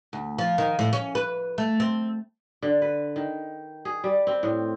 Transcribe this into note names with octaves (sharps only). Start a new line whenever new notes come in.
D2
F3
D#3
A2
C#4
B4
A3
C4
D3
B4
D#3
G#4
G3
C4
A2